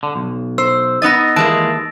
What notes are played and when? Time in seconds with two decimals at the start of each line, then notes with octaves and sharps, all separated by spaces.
0.03 D3
0.16 B1
0.58 C5 E6
1.02 B3 D#4 D#5 A6 A#6
1.36 D#2 E3 G#3 A#3 A5 D7